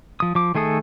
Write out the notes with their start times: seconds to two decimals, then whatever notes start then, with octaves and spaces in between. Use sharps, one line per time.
0.20 F3 D#6
0.35 F3 D6
0.55 D#3 A3 G#4 A4 D#6